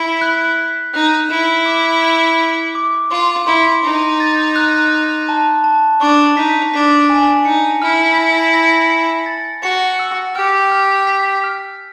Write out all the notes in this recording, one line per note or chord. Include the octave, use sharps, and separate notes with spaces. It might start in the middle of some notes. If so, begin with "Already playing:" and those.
Already playing: E4 G7
F#6
B6
D#4 F#6
E4 E7
D6
D7
D7
D6
F4 C6
E4 C6
D#4 C6
A6
F#6
F#6
A5
A5
D4 C#6
D#4 B6
D4 B6
G#5
D#4 C#7
E4 F6
A#6
A#6
C#7
A6
F#4 C#7
E6
G4 F6
F6
B6
F6